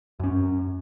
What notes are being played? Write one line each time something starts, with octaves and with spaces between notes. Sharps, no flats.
F#2 C#4